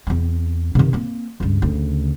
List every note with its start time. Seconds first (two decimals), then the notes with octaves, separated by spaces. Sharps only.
0.07 E2 C4
0.75 C3 D#3
0.93 A#3 C4
1.40 C#2 G2
1.62 D2 C#3